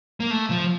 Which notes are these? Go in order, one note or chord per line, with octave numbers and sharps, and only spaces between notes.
A#3
A3
F3